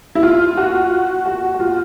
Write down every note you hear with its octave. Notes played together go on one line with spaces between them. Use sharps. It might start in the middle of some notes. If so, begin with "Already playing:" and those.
E4
F4
F#4
F#4
F#4
F4